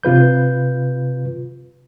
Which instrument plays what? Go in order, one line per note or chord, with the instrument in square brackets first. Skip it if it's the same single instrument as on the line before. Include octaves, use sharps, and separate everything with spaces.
[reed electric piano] C3 F4 B4 G6